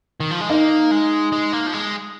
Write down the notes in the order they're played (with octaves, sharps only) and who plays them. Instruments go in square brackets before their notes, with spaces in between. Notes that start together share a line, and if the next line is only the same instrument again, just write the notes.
[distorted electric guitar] D#3
F3
G#3
[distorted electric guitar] A#3 [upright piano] D#4
[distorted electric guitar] G#3
G#3
A#3
F3
G#3